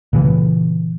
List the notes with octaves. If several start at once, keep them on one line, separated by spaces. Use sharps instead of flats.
A#2 C#3 E3